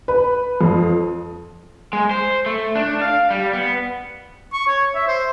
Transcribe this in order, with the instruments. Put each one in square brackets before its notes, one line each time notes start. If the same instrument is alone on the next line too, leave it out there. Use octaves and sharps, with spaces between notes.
[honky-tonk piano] B4
F2
[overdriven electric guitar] G#3
C5
A3
D4
F5
G3
B3
[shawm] C#6
C#5
E5
C5